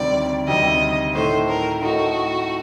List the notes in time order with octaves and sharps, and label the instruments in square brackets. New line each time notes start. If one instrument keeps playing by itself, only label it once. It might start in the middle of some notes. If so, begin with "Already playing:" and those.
Already playing: [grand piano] D2 C3 D#3 G3 C4 [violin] D5
[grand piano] D2 C3 D#3 G3 C4 [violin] D#5
[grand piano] A2 A3 D#4 [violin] C5
[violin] A#4
[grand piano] A2 A3 D#4 [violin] F#4